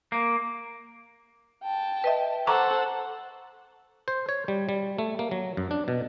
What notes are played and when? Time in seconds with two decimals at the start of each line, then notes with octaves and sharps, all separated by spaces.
0.12 A#3
1.64 G5 A5
2.04 B4 D#5 E5
2.47 A4 C5 F#5 A#5 C#6 D6
4.08 C5
4.29 C#5
4.48 G3
4.69 G3
4.99 A3
5.19 A#3
5.31 F#3
5.57 F#2
5.71 D4
5.88 B2